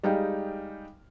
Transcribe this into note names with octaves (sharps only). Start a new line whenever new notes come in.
G3 G#3 D#4 F5 G5